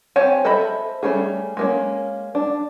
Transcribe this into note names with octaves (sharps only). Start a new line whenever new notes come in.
C4 G4 C5 C#5 G#5
A4 C5 D#5 E5 B5
G3 A3 C#4 G#4
G#3 A#3 C#4
D4